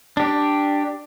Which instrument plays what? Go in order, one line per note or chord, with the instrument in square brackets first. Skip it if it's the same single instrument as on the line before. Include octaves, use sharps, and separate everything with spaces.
[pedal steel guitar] D4 G4